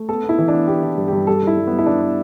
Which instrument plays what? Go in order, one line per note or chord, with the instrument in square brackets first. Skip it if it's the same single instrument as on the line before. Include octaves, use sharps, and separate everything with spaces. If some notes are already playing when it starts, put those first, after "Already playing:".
Already playing: [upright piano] A3
B3 A4
B3
E4
E3
D4
B3
B3 G4
E3
G2
G2 G4
G3 A4
G2 E4
G2
B3
G3
E4
G2 D4
B3